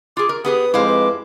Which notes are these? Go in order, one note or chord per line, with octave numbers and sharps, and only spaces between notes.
F4 G#4 D6
A#4
B3 G4 G#4 B4 D#6
F2 G#3 E4 C5 F5 D6
B4